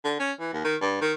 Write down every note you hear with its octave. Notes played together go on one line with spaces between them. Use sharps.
D3
C#4
E3
D#2
D#3
G2
D#3